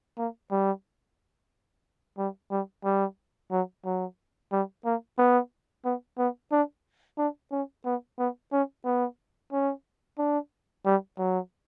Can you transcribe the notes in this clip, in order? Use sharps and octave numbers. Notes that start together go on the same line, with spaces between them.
A#3
G3
G3
G3
G3
F#3
F#3
G3
A#3
B3
B3
B3
D4
D4
C#4
B3
B3
C#4
B3
C#4
D4
G3
F#3